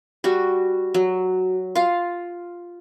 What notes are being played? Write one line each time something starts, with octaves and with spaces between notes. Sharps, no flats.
G3 F#4
F#3
F4 F5